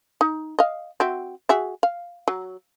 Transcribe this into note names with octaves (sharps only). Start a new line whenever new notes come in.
D#4
D#5 F5
C4 F#4 E5
F#4 G#4 E5
F5
F#3